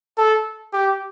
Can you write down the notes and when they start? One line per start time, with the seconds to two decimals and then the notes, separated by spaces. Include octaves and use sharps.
0.18 A4
0.73 G4